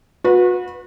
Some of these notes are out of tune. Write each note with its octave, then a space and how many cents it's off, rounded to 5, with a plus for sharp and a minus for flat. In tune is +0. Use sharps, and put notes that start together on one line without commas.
F#4 -35 B4 -10